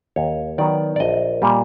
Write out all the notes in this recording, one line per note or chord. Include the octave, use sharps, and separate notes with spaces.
D#2 C#5
D#3 F#3 B3 D5
D5
A#1 D#5
A#2 G3 A#3